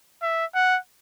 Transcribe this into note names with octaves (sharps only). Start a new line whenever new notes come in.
E5
F#5